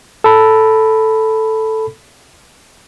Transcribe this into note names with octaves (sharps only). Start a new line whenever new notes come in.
A4 B5